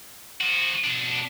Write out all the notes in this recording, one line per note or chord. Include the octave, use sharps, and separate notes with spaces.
F3 F#4
B2 D4